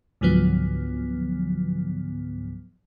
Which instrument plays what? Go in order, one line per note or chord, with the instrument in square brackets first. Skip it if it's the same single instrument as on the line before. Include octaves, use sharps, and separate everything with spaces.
[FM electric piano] C#2 G#2 D3 F3 F#3 B3